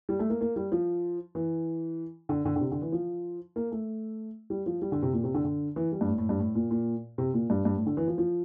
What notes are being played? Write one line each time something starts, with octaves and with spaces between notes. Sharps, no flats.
G3
A3
A#3
A#3
G3
F3
E3
D3
D3
D3
C3
D3
E3
F3
A#3
A3
G3
F3
G3
D3
C3
A#2
C3
D3
D3
E3
G3
G2
A2
A2
G2
A2
A#2
A#2
C3
A#2
G2
G2
A2
D3
E3
F3
F3